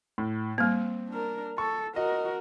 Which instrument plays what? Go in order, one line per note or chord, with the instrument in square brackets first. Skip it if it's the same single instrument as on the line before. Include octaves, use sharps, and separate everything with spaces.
[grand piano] A2
[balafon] G3 A#3 [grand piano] C4
[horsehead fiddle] D4 A#4
[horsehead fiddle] A4 [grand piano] C#6
[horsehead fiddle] F#4 A#4 [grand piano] D#5